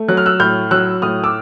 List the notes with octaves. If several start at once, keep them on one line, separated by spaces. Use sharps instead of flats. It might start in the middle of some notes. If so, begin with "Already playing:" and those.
Already playing: A3
F#3 F#6
F6
E6 F#6
A2 F6 G6
F#3 E6 F#6
A2 D#6 F6
D6 E6